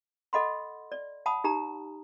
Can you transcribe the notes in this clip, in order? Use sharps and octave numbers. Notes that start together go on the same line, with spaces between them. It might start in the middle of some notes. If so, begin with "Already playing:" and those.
A4 D#5 F#5 B5 C6
D5
F#5 A5 B5 D#6
D#4 G4 A#5